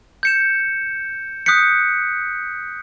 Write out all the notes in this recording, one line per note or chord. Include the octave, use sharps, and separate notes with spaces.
G6 C#7 E7
D#6 F#6 G6 B6 C#7